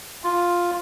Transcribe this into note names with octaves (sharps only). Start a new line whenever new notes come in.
F4